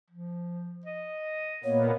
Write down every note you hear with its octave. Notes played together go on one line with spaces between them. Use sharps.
F3
D#5
A#2 A#3 B3 C#5